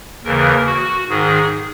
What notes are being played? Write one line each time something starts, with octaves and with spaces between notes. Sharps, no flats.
D#2 C#3 E3 A#4
F#4
G#2 D#3 G#4